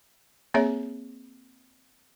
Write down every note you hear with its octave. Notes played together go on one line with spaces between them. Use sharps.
A#3 C4 G#4 C#5 E5